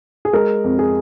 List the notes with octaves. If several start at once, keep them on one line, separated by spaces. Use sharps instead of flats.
G#4
G#3 A#4
F2
G#4